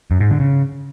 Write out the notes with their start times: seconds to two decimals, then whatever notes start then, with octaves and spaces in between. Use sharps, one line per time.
0.11 F#2
0.20 G#2
0.30 D3
0.40 C#3